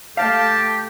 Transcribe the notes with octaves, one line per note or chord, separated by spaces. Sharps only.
A3 G4 F5 G5 A5